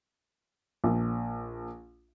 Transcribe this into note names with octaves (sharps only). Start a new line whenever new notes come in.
A#1